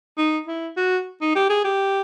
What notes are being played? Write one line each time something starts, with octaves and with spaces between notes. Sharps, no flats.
D#4
E4
F#4
D#4
G4
G#4
G4